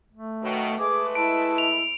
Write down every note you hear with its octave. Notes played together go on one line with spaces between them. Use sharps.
A3
B2 D#3 F#3
G#3 A3 G#4 B4 D6
E4 A5 D7
F7